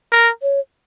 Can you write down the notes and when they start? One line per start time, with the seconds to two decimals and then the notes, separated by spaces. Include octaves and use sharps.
0.12 A#4
0.42 C#5